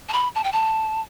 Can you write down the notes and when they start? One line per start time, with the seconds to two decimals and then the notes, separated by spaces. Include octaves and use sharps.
0.09 A5
0.13 B5
0.35 A5
0.44 G5
0.52 A5